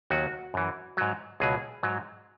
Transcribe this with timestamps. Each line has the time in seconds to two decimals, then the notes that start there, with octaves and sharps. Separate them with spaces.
0.10 D#2 D#3 F#3 F#4
0.54 F#2 E3
0.97 G#2 F#3
1.40 C#2 B2 F#3 G#4
1.83 G#2 F#3